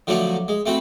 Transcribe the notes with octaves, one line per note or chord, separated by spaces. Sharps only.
D3 F3 F#3 A3 D4 F#4
G#3
A3 C4 F#4 B5